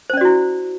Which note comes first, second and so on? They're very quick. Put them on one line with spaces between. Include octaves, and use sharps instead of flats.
C5 C#4 D5 F#4 E4